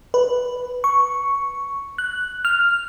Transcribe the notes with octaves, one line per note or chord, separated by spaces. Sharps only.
B4
C#6
F#6
F6